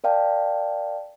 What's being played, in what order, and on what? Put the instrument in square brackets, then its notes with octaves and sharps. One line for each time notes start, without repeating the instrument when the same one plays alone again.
[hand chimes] A#4 D5 F5 G5 A5